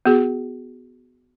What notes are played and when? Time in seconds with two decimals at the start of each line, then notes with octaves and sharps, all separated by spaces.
0.06 B3 F#4 G#4